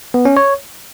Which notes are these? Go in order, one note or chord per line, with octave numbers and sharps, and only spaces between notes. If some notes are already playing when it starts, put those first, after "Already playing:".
B3
C#4
C#5